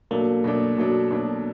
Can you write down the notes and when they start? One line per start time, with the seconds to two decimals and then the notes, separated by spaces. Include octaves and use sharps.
0.11 B2 F#3 A3 A#3 D4
0.44 B2 F#3 A3 D4
0.78 B2 F#3 A3 D4
1.11 B2 F#3 A3 D4